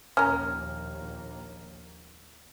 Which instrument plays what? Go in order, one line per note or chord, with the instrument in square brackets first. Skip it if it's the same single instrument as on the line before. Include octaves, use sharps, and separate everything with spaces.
[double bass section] A#1 D#2 A#3 [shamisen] C#4 A#4 [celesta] F6